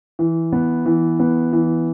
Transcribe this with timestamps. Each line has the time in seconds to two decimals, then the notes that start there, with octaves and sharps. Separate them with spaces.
0.19 E3
0.52 B3
0.86 E3
1.19 B3
1.53 E3